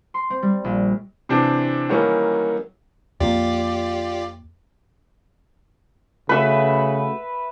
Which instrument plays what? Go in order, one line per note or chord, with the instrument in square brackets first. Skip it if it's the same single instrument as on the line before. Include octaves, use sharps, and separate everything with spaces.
[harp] C6
C4
G3
A#1
[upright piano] C3 E3 C4 D4
D#3 E3 F#3 G3 A#3 C#4
[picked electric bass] F2 A#3 [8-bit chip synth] F4 G4 D5
[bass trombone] C#3 [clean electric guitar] A3 F#4 [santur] B4 E5